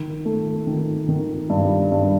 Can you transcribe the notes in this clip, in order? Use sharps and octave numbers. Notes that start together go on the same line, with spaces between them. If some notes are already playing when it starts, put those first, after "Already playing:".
Already playing: D#3
A3
D#3
D#3
G2
G2